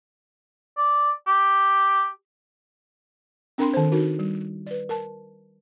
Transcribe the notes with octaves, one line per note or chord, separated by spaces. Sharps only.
D5
G4
C4 D4 A#4 G5 B5 C6
D#3 C5
D#4 F#4 A#4
G3
B4 D5
A#4 A5